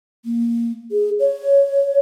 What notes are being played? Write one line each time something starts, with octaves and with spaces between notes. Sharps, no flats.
A#3
G#4
C#5